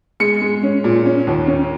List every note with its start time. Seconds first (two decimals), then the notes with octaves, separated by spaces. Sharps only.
0.20 G#3 C#7
0.41 G#3
0.63 C#4
0.84 A#2
1.06 C#4
1.27 D#2
1.47 C#4